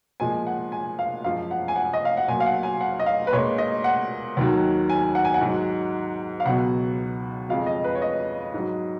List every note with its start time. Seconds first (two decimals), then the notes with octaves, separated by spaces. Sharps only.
0.20 A#2 F3 G#3 G#5
0.47 F#5
0.72 G#5
0.99 F5
1.24 F#2 F3 G#3 F5
1.51 F#5
1.68 G#5
1.76 F#5
1.93 D#5
2.05 F5
2.17 F#5
2.28 A#2 F#3 G#5
2.40 F5
2.46 F#5
2.63 G#5
2.81 F#5
3.00 D#5
3.06 F5
3.27 B4
3.33 A#2 G#3 C#5
3.58 D#5
3.84 F#5
4.37 D#2 D#3 F#3
4.90 G#5
5.15 F#5
5.25 G#5
5.34 F#5
5.41 G#2 F#3
6.40 F5
6.45 C#2 B2 F#3 F#5
7.49 F2 C#3 F3 G#3 F5
7.66 D#5
7.84 B4
7.95 C#5
8.02 D#5
8.54 G#2 F#3